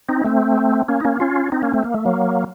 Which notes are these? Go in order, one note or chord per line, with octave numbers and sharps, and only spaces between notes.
C4 D#4
A3 C4
A#3 C#4
D#4
A#3 C#4
C#4 F4
C4 D#4
A#3 C#4
A3 C4
A#3
A3
F#3 A#3